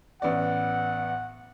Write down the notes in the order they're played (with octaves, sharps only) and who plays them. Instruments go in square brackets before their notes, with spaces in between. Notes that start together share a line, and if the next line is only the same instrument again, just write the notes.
[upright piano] A1 B3 D5 [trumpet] F#5